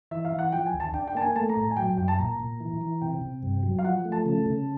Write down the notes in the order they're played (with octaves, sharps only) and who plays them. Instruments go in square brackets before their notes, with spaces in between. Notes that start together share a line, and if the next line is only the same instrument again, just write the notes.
[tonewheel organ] E3 [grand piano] E5
[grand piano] F5
[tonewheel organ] E3
[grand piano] F#5
[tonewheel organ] F3 [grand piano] G5
[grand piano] G#5
[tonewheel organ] D#2
[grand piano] A5
[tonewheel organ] D4 [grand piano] G5
[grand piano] G5
[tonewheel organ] A#3 [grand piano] A5
[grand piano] G#5
[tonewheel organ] A3 [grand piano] A5
[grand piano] A#5
[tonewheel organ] A2
[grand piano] A5
G#5
[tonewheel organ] F#3 [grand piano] G5
[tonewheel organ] F#2 [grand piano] G5
[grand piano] A5
[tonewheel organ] A#2 [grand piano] A#5
[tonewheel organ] A#2
E3
E3
[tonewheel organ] C3 [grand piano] G5
[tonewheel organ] C3
G2
F#3
[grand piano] F5
[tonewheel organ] F3 [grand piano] F#5
[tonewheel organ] A3
[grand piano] A5
[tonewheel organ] C#3
C#3